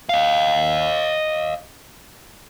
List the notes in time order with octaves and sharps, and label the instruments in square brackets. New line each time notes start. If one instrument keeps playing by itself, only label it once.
[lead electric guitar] D#5 F5